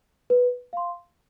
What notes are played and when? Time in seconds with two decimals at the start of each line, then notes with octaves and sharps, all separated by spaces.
0.30 B4
0.73 F5 C6